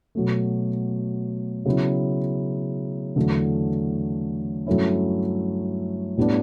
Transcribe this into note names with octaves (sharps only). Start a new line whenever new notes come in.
B2 F#3 A3
C#3 F#3 B3 E4
E2 D3 F#3 A3
G2 F#3 A3 C#4 E4
A2 G3 B3 D4